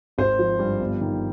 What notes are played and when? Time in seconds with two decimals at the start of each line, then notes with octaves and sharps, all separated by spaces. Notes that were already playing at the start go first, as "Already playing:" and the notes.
0.18 G#1 C5
0.39 F3
0.59 G2
0.81 G1
1.01 D#3